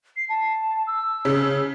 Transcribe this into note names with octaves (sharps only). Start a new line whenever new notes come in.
C7
A5
E6
C#3